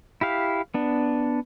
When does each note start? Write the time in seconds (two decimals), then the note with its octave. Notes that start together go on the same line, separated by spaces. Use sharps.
0.21 E4 G4 F5
0.74 B3 D4